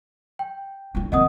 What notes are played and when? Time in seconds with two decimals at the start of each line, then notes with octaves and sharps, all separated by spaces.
0.39 G5
0.95 D4 F4
1.12 D#3 C4 D#5 F#5 D#6